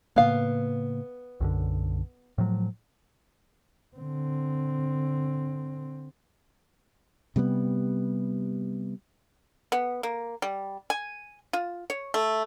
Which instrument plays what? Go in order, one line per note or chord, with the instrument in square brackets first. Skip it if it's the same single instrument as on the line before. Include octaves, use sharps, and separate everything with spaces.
[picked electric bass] A2 C#3 A#3 [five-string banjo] B3 F5
[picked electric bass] B1 F#2 D3
A2 F3 F#3
[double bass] D3 C4
[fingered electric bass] C3 G3 G#3 B3
[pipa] B3
A#3
G3
G#5
F4
C#5
A3